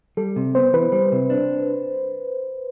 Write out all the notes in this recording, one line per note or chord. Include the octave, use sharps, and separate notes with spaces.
G3 A4
C3
B3 C5
E3 B4
G3
C3
D4